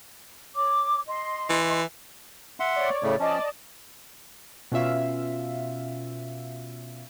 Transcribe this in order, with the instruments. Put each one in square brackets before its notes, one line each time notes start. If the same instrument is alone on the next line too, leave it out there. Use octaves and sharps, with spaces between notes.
[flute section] C#5 D6
D#5 C6
[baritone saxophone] E3
[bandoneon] E5 F#5 C6
[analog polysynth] C#5 D5
[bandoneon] A2 C#3 A3
[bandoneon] F3 C#4 [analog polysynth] D5 D#5 A5
[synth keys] B2 C#4 F4 E5 F5